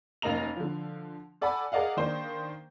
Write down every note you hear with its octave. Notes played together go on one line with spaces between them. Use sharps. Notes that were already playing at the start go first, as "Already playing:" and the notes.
F1 F#2 A#3 D#4 A#5 F7
D3 F3
A4 D5 F#5 G#5 B5
G#4 A#4 D5 D#5 F5 F#5
D#3 A#3 D4 C5